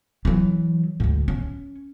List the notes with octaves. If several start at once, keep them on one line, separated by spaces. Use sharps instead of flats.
E3 F#3
D2 G#2
C#4